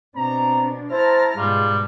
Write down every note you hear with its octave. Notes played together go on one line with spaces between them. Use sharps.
B2 C4 D4 A#5
E4 C5 A5 A#5 F6
G#2 B2 G3 F4 G#4